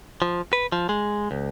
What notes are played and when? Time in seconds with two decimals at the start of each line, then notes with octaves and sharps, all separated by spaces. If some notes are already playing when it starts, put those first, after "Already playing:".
0.22 F3
0.53 B4
0.72 F3
0.89 G#3
1.31 C#2